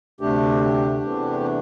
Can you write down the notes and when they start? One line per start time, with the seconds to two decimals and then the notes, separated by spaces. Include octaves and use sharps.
0.21 D2 C3 A3 D4 G4
1.00 E2 C3 E3 A3
1.40 D4